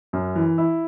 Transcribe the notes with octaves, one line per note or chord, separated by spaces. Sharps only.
F#2
E3
E4